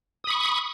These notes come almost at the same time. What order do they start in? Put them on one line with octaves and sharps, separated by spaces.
D#6 B5 C#6